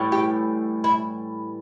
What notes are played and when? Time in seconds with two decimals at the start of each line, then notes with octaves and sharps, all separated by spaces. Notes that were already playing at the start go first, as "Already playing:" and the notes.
Already playing: A2 E3 G3
0.12 G4
0.84 E4